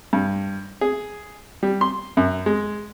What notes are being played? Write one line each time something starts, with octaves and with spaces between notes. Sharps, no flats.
G2
G#4
G3
C6
F#2
G#3